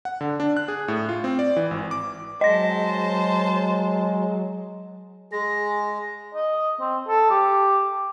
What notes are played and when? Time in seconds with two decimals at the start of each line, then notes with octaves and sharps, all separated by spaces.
0.05 F#5
0.21 D3
0.40 D4
0.57 F#6
0.68 G#4
0.88 A2
1.09 F4
1.24 C4
1.39 D5
1.56 E3
1.71 G#1
1.91 D6
2.41 F#3 G#3 C5 D#5 A5 A#6
5.32 G#3 G#4 A#6
6.34 D#5
6.80 C4
7.08 A4
7.30 G4